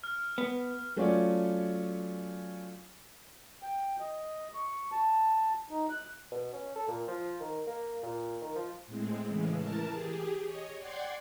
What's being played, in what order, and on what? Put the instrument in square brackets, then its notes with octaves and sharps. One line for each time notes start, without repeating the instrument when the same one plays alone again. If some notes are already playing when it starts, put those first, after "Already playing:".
[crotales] F6
[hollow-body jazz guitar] B3
[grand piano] F#3 A3 C#4 F4 C#5 D5
[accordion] G5
D#5
C#6
A5
D#4
F#6
[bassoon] B2
C#4
A4
A#2
F3
D#3
A#3
A#2
D#3
F3
[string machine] A2 G#3 C4
A2 C#3 E3 G#3
E3 A#4 A5
G4 G#4
C#5 D#5
D5 F#5 G5 C6 G#6 C7